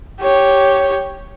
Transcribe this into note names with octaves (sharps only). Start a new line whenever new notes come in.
G4 C#5